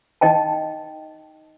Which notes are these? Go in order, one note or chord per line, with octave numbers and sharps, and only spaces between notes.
D#4 D#5 G5 A5